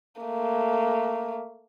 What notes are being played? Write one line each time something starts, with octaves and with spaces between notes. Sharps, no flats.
A3 A#3